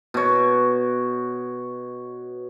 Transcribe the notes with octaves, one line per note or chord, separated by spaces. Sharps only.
B2 C#5